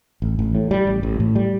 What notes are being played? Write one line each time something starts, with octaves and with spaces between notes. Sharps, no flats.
A1
A1
A2
G3
A1
A1
A2
G3